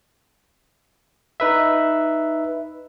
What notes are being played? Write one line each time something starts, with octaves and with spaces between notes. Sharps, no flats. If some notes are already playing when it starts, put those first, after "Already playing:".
D#4 B4 E5